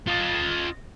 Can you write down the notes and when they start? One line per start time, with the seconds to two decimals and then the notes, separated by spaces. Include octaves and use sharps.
0.08 F4 D#5